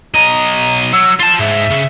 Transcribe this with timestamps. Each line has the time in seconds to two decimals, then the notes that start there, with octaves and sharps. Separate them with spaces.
0.15 B1 D#5 A#5
0.93 F#3 E6
1.20 F4 A5 A6
1.40 G#2 E5
1.71 C#3